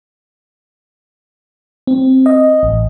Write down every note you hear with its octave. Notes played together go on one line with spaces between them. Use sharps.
C4
D#5
A1